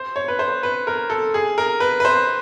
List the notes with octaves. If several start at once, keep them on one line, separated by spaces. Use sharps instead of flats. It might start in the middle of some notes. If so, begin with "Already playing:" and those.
Already playing: C5
C#5
B4
C5
B4
A#4
A4
G#4
A#4
B4
B4
C5